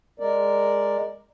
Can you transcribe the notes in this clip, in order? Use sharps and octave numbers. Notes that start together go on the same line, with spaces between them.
G#3 A#4 D5